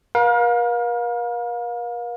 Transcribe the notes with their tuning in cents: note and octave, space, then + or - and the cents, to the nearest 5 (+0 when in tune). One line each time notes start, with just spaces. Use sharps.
A#4 +45 F5 +30